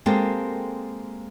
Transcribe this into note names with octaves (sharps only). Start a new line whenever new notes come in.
G#3 A#3 C4 G4 A4 A#4